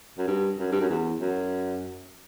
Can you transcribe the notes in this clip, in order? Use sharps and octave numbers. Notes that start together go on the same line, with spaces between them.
F#2
G2
F#2
G2
F#2
E2
F#2